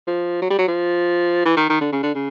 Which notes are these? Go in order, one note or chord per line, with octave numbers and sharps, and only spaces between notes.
F3
F#3
G3
F#3
F3
E3
D#3
D#3
D3
C#3
D3
C#3